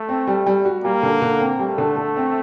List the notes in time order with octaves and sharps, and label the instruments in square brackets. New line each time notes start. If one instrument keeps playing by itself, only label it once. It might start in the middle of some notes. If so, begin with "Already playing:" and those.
Already playing: [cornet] A3
[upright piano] C4
G3
G3
F#4
[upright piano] G3 [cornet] A#3
[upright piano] D3
D3
C4
[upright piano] G3 [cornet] A3
[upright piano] D3
D3
C4